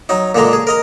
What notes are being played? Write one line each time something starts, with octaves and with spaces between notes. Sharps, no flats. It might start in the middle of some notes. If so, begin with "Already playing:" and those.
F#3 D#4
A#2 D3 G#3 A#5
G#4
A#4 D#5 A#5